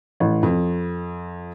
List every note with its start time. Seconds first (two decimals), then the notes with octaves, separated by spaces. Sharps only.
0.20 A1
0.43 F2